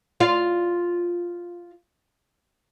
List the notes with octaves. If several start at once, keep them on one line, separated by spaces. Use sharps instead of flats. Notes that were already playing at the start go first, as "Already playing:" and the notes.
F4 D5 F5